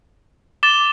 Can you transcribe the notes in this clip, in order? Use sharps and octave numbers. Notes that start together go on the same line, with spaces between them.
D6 A6 E7 G7